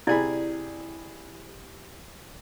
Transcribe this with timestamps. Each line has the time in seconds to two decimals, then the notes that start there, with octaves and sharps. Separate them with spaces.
0.07 C3 E4 G#4 D5 B5